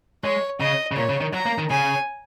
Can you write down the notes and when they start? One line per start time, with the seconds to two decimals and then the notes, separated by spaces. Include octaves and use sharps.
0.24 G#3 C#5
0.60 C#3 D#5
0.92 C#3
0.96 A#2 C#5
1.09 C#3
1.21 D#3
1.33 F#3 A#5
1.46 A#3
1.58 D#3
1.70 C#3 G#5